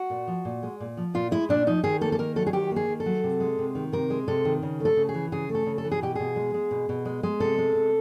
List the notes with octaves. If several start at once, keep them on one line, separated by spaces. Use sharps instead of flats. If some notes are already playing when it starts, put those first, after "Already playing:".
Already playing: F#4
A#2
F3
A#2
G#3
A#2
F3
A#2 F4
G#3 E4
A#2 D4
F3 D#4
D#3 G#4
A#3 A4
A4
D#3 A#4
F#3 A4
G#4
D#3 G4
A#3
G#4
D#3
A4
F#3
C3
G#3
C3
D#3
C3 A#4
G#3
C3 A4
D#3
C#3
A3 A4
C#3
G#4
E3
C#3 G#4
A3
A4
C#3
A4
E3
G#4
B2 G4
B2 G#4
G#3
G#3
B2
B2
G#3
G#3
C3 A4
G#3
C3